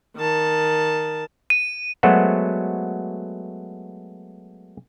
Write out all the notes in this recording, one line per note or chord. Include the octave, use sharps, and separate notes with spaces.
D#3 A5
D#7
F#3 G#3 A3 B3 F#4 C5